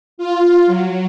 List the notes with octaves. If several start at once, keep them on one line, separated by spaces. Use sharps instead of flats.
F4
F#3